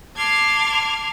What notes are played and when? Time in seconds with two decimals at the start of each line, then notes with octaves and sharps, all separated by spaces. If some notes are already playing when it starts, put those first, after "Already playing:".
0.16 A5 C6 D6 F6 G#6